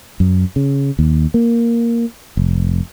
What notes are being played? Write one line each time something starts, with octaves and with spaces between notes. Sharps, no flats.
F#2
C#3
D#2
A#3
F1